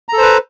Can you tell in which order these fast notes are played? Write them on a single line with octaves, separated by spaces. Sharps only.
A#5 A4 C5 B4